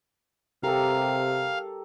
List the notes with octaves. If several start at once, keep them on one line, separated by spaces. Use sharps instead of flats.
C3 G4 A4 A#4 F5